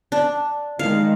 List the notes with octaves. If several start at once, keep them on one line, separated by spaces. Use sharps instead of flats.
D4
D#3 G#3 F5